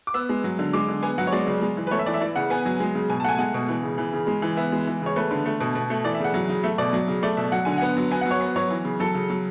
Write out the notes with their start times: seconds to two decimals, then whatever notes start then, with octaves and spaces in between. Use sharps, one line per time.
0.07 D6
0.14 B3 E6
0.29 G#3
0.44 F#3
0.59 D3
0.73 G#3 D6
0.88 D3
1.03 B3 G#5
1.18 F#3 F#5
1.27 C#5
1.32 G#3 D5
1.47 C#3
1.62 G#3
1.77 E3
1.87 B4
1.91 A3 C#5
1.99 E5
2.06 E3 D5
2.14 E5
2.21 E3 D5
2.36 C#3 F#5
2.50 B3 G#5
2.65 F#3
2.80 G#3
2.95 C#3
3.09 B2 G#5
3.20 A5
3.24 A3 F#5
3.29 G#5
3.39 G#3 F#5
3.54 B2
3.69 E3
3.83 C#3
3.98 E3
4.13 C#3
4.27 G#3
4.42 E3
4.57 B3 E5
4.72 G#3
4.87 E3
5.01 C#3 C#5
5.16 A3 B4
5.31 D3
5.46 A3
5.60 B2
5.75 B2
5.90 A3
6.04 E3 D5
6.15 E5
6.20 C#3 F#5
6.34 F#3
6.49 C#3
6.64 A3 E5
6.78 B2 D5
6.93 F#3
7.08 C#3
7.23 A3 D5
7.37 B2 E5
7.52 F#3 F#5
7.65 D3 G#5
7.78 B3 F#5
7.97 F#3
8.11 B3 G#5
8.21 F#5
8.26 F#3
8.31 C#5
8.41 B3
8.56 F#3 C#5
8.70 E3
8.85 C#3
9.00 F#3 A4
9.14 C#3
9.30 F#3